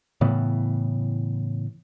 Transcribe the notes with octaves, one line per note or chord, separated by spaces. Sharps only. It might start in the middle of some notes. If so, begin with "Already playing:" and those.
A2 C#3 E3 B3